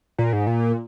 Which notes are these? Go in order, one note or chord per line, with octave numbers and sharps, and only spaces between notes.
A#2
G#2
A#2